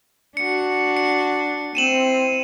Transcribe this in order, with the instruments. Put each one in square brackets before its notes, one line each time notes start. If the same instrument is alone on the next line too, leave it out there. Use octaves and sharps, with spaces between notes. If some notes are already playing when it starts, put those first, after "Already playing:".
[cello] D4 F#4 [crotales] C#7
[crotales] C#7
[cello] C4 E4 [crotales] D#7 E7 F#7